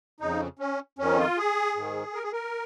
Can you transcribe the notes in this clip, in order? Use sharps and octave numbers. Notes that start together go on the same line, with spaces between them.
F2 C#3 D#4
C#4
F2 D#3 C#4
F4
G#4
G#2 D#3
A#4
G#4
A#4